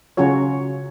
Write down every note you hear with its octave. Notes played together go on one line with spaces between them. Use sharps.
C#3 F#3 C#4 F4 F#4 C#5